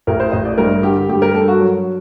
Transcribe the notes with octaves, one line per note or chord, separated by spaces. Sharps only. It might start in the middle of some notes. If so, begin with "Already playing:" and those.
A1 A#4
C5
A1 D#5
D5
G2 A#4
D3 G4
G2 G4
A#4
G2 A4
F#4
F#3